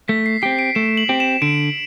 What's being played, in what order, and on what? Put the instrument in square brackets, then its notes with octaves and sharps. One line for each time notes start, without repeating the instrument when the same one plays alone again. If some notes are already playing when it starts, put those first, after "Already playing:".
[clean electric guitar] A3 [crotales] B6
[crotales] C7
[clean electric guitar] C4 G4 [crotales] C7
[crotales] D7
[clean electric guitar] A3 [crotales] E7
[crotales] F#7
[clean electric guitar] C4 G4
[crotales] E7
[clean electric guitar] D3 [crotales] D7